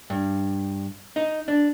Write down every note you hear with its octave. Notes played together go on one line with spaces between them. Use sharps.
G2
D#4
D4